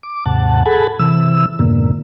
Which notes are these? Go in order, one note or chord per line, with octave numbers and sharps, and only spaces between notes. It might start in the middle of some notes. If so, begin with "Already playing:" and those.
D6
D#2 G#2 C3 F#5 A5
G#4 A4 F#5 G#5 A5 B5
C3 E3 E6
F2 G#2 B2 D3 A#3